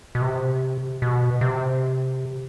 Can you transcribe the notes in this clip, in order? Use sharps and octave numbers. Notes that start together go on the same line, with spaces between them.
B2
C3
B2
C3